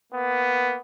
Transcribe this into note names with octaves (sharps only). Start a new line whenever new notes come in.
A#3 B3